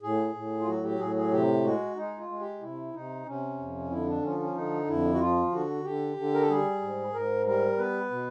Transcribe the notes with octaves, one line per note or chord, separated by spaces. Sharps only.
A2 G#4
A2
F4
F#3 F#4
G4
A2 G#4
G#4
C3 G4
G#3 F#4
G#3 D#4
F4
G#3
G4
C3 E4
C3 D#4
C3 C#4
F2
D3 E4
D4
F3 C#4
C#4
D3 D#4
F2 E4
F#4
F3 F4
D3 F#4
D3 G4
D3
A#4
A4
G3 G#4
G#2
G#2 A#4
G3 A#4
B3 B4
B2